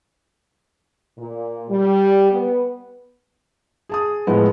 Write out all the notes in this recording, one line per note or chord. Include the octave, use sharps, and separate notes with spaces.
A#2
G3
B3
G#4 A5 D#6
A2 F3 G#3 B3